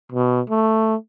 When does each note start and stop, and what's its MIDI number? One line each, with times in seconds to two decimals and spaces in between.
0.12 0.41 47
0.49 0.95 57